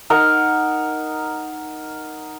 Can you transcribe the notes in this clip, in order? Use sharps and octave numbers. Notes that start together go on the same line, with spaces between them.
D#4 A#4 F#5